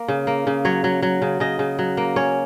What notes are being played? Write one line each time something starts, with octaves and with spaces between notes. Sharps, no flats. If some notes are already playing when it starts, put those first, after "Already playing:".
Already playing: A#3
C#3
A#3
C#3
F#3 C#5
F#3
F#3
C#3
C#3 D#5
C#3
F#3
A#3
C#4 C#5